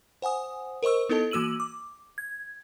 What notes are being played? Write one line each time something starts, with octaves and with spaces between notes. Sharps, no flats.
C5 F#5 G#5 D#6
A#4 C5 D#5 C#6 E6
B3 D#4 E4 A4 D#5 A5
E3 A#3 F#4 E6 D#7 F#7
D6
G#6